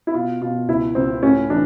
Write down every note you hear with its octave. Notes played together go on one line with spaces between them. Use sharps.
E4
B2 F4
B2 F4
C#2 E4
C#2 C4
A2 C#4
E3 D4